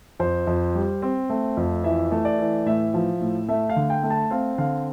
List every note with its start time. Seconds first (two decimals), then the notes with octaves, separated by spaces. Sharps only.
0.20 F2 C5
0.47 F2
0.75 G3
1.02 C4
1.30 A3
1.57 F2
1.84 E3 E5
2.12 A3
2.25 D5
2.38 E3
2.66 A2 E5
2.94 F3
3.21 A2
3.48 A3 E5
3.69 F5
3.76 D3
3.90 G5
4.03 A3
4.10 A5
4.30 C4 F5
4.58 D3 F5